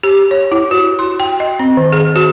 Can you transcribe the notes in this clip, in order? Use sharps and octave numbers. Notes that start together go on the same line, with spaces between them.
G4
C#5
E4
F#4
C6
G5
D#5
C4
D#3
G#4
F#4